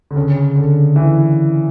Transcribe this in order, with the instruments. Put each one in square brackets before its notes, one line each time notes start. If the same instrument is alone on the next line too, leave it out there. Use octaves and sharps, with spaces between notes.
[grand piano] D3
C#3
D3
E3